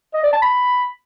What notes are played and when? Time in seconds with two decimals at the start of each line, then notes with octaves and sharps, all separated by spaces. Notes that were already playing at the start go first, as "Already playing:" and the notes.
0.14 D#5
0.23 D5
0.33 A5
0.42 B5